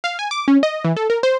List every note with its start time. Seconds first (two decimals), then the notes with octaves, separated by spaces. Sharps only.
0.04 F5
0.19 G#5
0.31 D6
0.48 C#4
0.63 D#5
0.85 E3
0.97 A4
1.10 A#4
1.23 C5